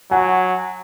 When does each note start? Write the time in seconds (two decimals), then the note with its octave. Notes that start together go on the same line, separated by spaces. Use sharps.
0.11 F#3 F#5 G#5